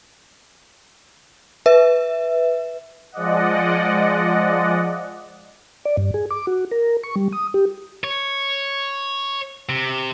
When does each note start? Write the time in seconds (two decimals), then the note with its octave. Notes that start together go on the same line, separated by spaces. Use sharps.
1.66 B4 E5
3.12 F3 G#3 D5 D#5 F#5
5.85 D5
5.97 G2
6.14 G#4
6.30 D6
6.47 F#4
6.71 A#4
7.03 C#6
7.16 G3
7.32 D#6
7.54 G4
8.04 C#5
9.69 C3